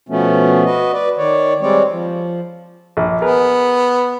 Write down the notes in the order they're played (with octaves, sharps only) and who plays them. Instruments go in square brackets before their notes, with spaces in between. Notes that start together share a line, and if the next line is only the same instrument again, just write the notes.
[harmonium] B2 F3 A3 B3 C#4
F#4 B4 D#5
B4 D5
D#3 C#5 D5
G3 G#3 C4 C#5 D5
F3
[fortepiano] A#1
[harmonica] B3 [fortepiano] G#4 A#4 B4